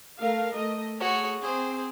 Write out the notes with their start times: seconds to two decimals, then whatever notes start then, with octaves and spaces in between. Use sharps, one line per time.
0.19 A3 A#4 F5
0.54 A3 D#5
0.99 A3 F#4 G#4 C#5
1.42 C4 G#4 C5